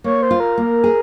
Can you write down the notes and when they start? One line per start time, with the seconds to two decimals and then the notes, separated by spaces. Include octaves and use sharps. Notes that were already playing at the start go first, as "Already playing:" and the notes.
0.04 A#3 C#5
0.23 C5
0.31 F4
0.40 A#4
0.58 A#3
0.84 G#4